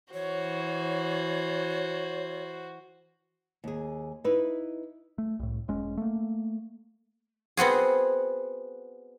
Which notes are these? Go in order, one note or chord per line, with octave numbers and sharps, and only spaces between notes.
E3 F#4 C5 C#5
D#2 G#4
D#4 E4 B4
A3
C2 A2
E1 G#3 C#4
A3 A#3
B3 C4 F#4 G#4